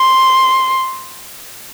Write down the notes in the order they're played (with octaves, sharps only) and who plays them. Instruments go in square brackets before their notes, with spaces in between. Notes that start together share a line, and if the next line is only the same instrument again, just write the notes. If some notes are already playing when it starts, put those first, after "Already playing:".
Already playing: [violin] C6